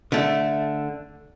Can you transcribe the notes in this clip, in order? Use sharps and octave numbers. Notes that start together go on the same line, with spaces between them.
D3 A3